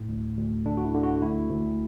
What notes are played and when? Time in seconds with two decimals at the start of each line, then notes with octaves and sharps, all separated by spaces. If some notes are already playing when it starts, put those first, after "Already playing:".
Already playing: A2
0.09 D2
0.38 D2
0.66 D3 D4
0.77 F#4
0.84 E4
0.94 D3
1.03 F#4
1.22 D2 E4
1.51 D2